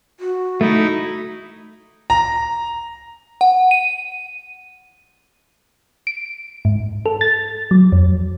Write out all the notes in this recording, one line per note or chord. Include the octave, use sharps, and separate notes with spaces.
F#4
A3 D#4 E4
A#5
F#5
D#7
D7
G#2
A4
A6
F#3
F2